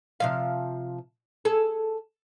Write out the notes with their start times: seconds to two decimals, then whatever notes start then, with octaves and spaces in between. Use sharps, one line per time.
0.20 C3 F3 F5
1.45 G#4 A4